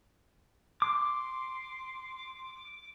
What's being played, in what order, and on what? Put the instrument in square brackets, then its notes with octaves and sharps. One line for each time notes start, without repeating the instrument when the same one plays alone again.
[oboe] C6 [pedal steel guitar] D6